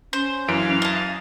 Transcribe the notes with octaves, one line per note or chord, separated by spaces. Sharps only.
C#4 C5
F#2 E3 F5 D7
D#5 A5